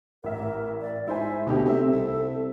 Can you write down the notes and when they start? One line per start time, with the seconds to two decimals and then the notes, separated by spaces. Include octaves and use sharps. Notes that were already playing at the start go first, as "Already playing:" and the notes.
0.24 A1 A#4 E5
0.81 D5
1.07 G#2 E4 C5 E5 G#5
1.47 D2 B2 D#4 G4
1.65 C3 C4 A4 E5
1.92 C2